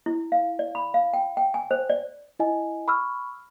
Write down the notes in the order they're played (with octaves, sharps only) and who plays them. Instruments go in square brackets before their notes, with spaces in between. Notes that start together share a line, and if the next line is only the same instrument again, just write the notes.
[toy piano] E4
F5
D5
B5
F5
G5
G5
G#5
C5
D5
[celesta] E4 D#5 G#5
B5 C#6 E6 F6